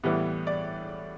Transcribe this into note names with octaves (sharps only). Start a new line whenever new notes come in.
A2 E3 G3 B3
D5